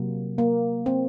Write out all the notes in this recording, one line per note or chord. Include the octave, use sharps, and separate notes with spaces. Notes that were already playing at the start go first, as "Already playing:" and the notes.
Already playing: C3 F#3 A#3
A#3
C4